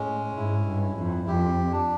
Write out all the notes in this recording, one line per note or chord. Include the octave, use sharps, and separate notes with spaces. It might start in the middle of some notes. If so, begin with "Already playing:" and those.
Already playing: A2 G#3 C#4
G#2 E4
G2
E4
F2
F2 G4
D4